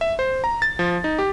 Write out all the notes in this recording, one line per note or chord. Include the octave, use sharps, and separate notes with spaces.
E5
C5
A#5
A6
F3
D#4
G4